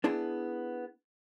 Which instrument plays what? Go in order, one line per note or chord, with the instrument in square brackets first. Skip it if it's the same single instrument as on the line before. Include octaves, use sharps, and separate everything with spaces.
[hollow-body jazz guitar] B3 D4 E4 G#4 A5